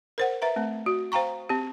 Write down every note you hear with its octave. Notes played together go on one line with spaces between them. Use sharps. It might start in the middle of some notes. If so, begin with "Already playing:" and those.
A#4 C5 F#5
B4 E5 A#5
A3 C4
F#4
C5 F5 G5 A#5 C#6
C4 G4